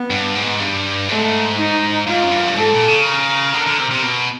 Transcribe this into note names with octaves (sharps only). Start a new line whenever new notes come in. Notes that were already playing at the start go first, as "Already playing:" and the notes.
Already playing: B3
G2
G#2
G2
G#2 A3
D#4
G#2 F4
F#2
G2
F#2
G2
G#2 A4
A#2
C#3
A#4
D3
D3
C3
C3
B2